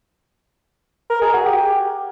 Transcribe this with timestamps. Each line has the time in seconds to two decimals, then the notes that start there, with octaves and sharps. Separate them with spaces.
1.10 A#4
1.22 G#4
1.33 F#4
1.45 G4